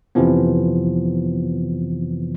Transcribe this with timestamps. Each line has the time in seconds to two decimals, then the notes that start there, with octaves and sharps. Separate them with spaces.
0.15 F2 C3 E3 F3 B3